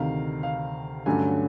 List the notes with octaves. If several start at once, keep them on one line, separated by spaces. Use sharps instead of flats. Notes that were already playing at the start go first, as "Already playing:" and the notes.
Already playing: D2 C3 D#3 F5
F5
G2 D3 F#3 A3 C#4 G#5